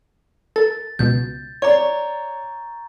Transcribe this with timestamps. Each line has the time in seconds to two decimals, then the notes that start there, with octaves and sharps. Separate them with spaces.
0.56 A4 A#4 A6
0.99 C#2 B2 G6
1.62 C#5 D5 A#5 C#6